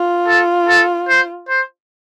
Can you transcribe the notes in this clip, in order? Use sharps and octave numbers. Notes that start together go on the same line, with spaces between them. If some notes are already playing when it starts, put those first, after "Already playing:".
Already playing: F4
A4
A4
C5
C5